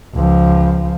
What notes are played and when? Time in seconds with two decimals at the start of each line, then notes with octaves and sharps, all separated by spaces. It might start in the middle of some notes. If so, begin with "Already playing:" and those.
0.15 C#2 F3